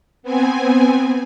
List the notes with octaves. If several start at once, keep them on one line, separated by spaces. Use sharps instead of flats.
B3 C4 G#5